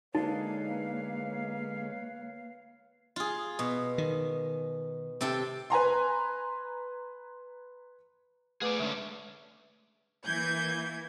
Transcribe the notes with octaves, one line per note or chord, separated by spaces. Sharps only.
D3 G#3 A#3 D#4 B4 C#5 F5
F4 G#4
B2
D#3
C3 A4 G5
B4 G#5 A#5 C6
A3 G#4 B4 D5 D6
D3 G#3 C#4 D4
E3 A#3 G6 G#6